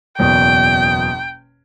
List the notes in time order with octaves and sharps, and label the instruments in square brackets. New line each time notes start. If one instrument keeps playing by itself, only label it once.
[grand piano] F#1 E2 B2 [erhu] G5